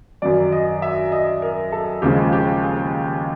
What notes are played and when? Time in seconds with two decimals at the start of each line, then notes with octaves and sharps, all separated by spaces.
0.22 F#2 D#3 F#3 D5
0.52 D#5
0.82 E5
1.12 D#5
1.42 A#4
1.72 A4
2.02 D#2 C#3 F3 G#3 G4
2.33 G4
2.63 G#4